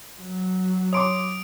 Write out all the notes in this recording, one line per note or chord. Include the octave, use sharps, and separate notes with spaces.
F#3
C#5 C6 D6 D#6 D7